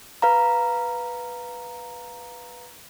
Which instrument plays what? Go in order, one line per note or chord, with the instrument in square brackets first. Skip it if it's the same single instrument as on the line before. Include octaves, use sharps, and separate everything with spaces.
[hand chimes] B4 F5 A#5